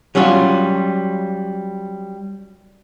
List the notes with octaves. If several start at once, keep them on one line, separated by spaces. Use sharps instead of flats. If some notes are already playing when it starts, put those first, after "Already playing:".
F#3 G3 C#4 F4 F#4